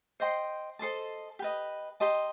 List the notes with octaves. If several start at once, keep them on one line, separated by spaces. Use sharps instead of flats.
C5 D#5 G5 C6
A4 C5 D#5 A5
G4 B4 D#5
G4 D#5 A5 C6